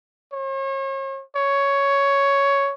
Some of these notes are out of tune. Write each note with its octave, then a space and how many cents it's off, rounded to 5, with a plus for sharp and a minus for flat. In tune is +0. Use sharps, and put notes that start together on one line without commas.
C#5 -40
C#5 +5